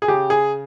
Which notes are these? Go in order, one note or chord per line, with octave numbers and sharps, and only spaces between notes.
G#4
C#3 G4
G#4